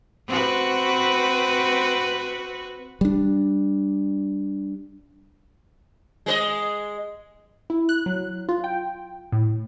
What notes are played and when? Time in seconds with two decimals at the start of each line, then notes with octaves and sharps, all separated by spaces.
0.28 C4 F#4 B4
3.01 G3 D4
6.26 G#3 B4 D#5
7.70 E4
7.89 F#6
8.06 F#3
8.49 F4
8.64 G5
9.32 A2